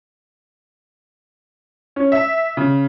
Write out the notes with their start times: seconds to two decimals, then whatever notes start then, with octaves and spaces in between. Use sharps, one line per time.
1.96 C#4
2.12 E5
2.57 C#3